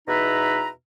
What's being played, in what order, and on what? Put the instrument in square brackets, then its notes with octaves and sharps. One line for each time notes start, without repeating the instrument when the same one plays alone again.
[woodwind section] E2 B2 D#4 B4 E5 A#5